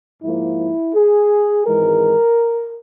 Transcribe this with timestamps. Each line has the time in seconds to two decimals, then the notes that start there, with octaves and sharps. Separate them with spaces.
0.22 G#2 F3 A#3 E4
0.95 G#4
1.66 G#1 G#2 E3 G#3 A#4